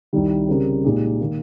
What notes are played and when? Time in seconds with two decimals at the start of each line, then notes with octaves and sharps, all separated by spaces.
0.13 C2 C3 D#3 G3
0.48 C#3 G3 C4 G4 A#4
0.84 A#2 G#3 D#4 G4
1.21 D#3 A#3